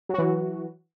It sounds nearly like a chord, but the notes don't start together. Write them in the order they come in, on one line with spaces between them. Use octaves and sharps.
F#3 F#4 E3